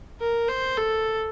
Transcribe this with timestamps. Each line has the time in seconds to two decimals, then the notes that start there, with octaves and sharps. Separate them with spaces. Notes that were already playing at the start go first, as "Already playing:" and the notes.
0.20 A#4
0.48 C5
0.77 A4